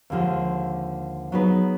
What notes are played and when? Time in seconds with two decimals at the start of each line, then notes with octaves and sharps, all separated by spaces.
0.10 D#2 D3 F3 G#3
1.32 F#3 B3 D#4 G#4 B4